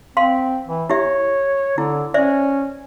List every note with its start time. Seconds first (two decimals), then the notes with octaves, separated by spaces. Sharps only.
0.17 C4 F5 C6
0.68 E3
0.90 E4 G4 C#5 E5
1.78 D3 E4
2.14 C#4 C5 D5 E5